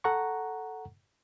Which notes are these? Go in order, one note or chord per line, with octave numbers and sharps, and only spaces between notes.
A4 F#5 A#5 C#6